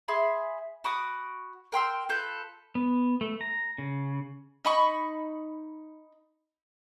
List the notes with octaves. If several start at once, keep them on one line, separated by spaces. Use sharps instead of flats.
G#4 E5 B5 C6
F#4 B5 D6 D#6
A#4 G5 C6 E6
F4 A4 B4 G6
B3
A3
A#5
C#3
D#4 B5 C#6